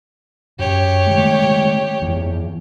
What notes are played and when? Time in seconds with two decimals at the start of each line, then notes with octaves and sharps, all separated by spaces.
0.59 F#2 G4 C#5
1.07 D#3 G#3 A3
2.02 F2 E3